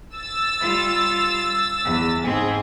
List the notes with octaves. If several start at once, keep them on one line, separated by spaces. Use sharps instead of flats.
E6 A6
G3 F4
E2
G#2 C4 G#4